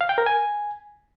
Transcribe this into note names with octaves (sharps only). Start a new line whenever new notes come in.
F5
G5
A#4
G#5